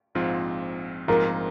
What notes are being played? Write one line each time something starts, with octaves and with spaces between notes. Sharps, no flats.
A#1 G#2 F3 C4 F4
A#1 G#2 F3 C4 F4 A#4